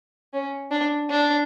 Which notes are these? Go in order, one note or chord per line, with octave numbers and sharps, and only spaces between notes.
C#4
D4
D4